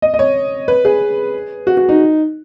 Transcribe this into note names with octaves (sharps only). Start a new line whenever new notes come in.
D#5
D#5
C#5
B4
G#4
F#4
F#4
D#4